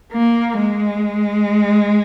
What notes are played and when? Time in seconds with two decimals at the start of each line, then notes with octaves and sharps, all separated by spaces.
0.13 A#3
0.59 G#3